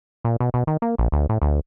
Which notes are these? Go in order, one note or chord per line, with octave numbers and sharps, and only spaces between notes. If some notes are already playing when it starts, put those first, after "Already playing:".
A#2
B2
B2
D#3
A#3
A#1
D2
A2
D2